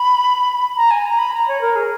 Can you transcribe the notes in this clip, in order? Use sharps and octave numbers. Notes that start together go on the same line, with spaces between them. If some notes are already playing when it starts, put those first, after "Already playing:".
Already playing: B5
A#5
G#5
A#5
B5
A#5
C#5
A#4
G#4